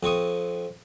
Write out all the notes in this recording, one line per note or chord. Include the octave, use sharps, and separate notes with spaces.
F2 C4 C#6 D#6